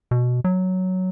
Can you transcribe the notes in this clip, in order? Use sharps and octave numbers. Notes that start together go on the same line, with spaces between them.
B2
F#3